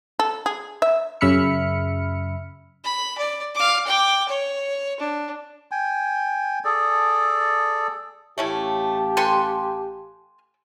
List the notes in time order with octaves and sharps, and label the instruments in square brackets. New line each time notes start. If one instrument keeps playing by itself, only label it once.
[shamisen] A4
G#4
E5
[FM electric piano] F#2 C#3 E5 B5 F6 C#7
[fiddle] B5
D5
F5 D6
G5 D6
C#5
D4
[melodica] G5 G#5
G#4 A4 D5
[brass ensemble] A1 F5 A5 [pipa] A3 C#4 E4 [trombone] G4
[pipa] A4 B4 G5 [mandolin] G#5 C6 F#6